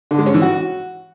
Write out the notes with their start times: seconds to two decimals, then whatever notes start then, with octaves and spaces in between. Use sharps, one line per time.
0.11 D3
0.19 G#3
0.26 C#4
0.34 E3
0.42 F#4